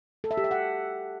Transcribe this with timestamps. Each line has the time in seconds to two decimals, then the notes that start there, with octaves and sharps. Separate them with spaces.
0.24 A4
0.31 E5
0.37 G4
0.44 E5
0.51 F#5